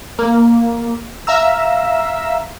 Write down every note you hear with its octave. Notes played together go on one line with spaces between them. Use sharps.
A#3
E5 F5 A#5 E6